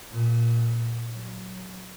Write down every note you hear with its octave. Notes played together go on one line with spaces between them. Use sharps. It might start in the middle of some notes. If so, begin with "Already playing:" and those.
A#2
F#3